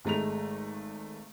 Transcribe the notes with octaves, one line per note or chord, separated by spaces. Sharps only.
G#1 G#3 A3 A#5 F7